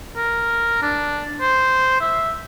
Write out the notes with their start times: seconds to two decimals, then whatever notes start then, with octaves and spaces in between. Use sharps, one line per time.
0.16 A#4
0.82 D4
1.41 C5
2.01 E5